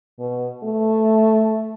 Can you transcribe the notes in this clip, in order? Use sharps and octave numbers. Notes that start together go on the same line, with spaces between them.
B2
A3